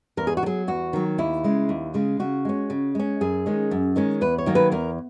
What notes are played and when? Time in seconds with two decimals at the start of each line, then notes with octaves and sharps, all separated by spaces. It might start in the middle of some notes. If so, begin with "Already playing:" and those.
0.17 E2 A#4
0.27 G#4
0.37 F#4
0.43 D#3
0.46 F#3 G#4
0.68 E2 F#4
0.93 D#3 F#3
1.18 D#2 E4
1.44 C#3 G#3
1.69 D#2
1.94 C#3 G#3
2.20 C#3 F#4
2.45 G#3 C#4
2.70 C#3
2.95 G#3 C#4
3.21 F#2 G#4
3.46 D#3 G#3 C#4
3.71 F#2
3.96 D#3 G#3 C#4
4.21 E2 B4
4.38 C#5
4.46 D#3 F#3 A#3
4.55 B4
4.72 E2 A#4